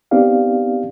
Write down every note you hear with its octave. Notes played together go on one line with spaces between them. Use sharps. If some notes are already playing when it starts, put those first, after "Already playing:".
B3 C4 D#4 G4 D5 F5